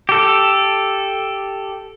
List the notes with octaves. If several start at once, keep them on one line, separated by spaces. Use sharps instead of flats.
G4 A4